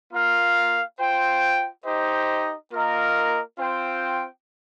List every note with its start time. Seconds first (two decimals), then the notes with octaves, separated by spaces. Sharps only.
0.12 A#3 F4 A#4 F5
0.99 F4 C5 G5
1.85 D#4 G4 C5 D#5
2.72 A#3 F4 A#4 D#5
3.57 C4 F4 C5 G5